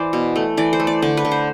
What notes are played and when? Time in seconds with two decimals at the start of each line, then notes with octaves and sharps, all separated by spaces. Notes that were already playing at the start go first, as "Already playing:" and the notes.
Already playing: E3 C5 D5
0.13 B2
0.36 A3
0.57 E3 D5
0.73 C5
0.80 A3
0.87 D5
1.02 D3 D5
1.17 B4
1.25 D3
1.32 C5